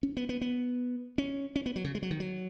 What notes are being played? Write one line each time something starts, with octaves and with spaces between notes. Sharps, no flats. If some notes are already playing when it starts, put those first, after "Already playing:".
C#4
B3
B3
B3
C#4
C#4
B3
F#3
C#3
G#3
F#3
D#3
F#3